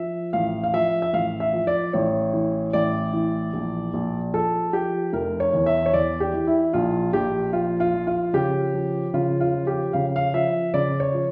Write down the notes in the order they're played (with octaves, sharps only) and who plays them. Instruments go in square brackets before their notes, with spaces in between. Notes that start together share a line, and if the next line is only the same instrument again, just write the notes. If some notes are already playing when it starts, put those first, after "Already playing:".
Already playing: [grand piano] F3 E5
A1 F5
F5
F3 E5
E5
A1 F5
E5
F3
D5
A1 C#5
E3
A1 D5
E3
A#1
A#1
F3 A4
F3 G4
F1 A#4
C#5
E2
E5
C#5
E2 D5
G4
E3
E4
A#1 F4
A#1 G4
F3 F4
F4
F3
F4
C#3 G4
F3
C#3 F4
F4
F3
G4
C#3 F5
F5
F3 E5
C#3 D5
C#5
F3